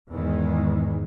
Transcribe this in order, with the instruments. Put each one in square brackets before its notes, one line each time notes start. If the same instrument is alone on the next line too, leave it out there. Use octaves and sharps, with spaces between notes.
[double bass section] E2 G#2 D#3 E3 G#3